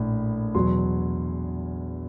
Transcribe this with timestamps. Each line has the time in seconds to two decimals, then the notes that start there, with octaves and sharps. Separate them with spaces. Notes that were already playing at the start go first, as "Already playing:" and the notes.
Already playing: A#1 A2
0.55 E2 B2 F#3 C6